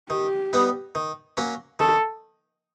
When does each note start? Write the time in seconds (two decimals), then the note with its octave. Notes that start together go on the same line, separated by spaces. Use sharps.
0.10 D#3 G4
0.53 G3 B3 D#4
0.95 D#3
1.37 F#3 A#3 C#4
1.79 D#3 A4